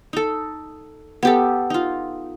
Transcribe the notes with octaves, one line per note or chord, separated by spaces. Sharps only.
D#4 A4
B3 G4 A4
D#4 F4